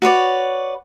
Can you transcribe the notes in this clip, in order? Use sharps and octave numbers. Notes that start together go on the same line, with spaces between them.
F#4 B4 C#5 D5